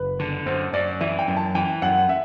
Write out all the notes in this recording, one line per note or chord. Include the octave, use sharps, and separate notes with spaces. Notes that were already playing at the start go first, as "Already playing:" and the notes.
Already playing: F#1 B4
D3
F#2 C5
F#2 D5
E3 E5
G5
F#2
A5
E3 G5
F#2 F#5
E5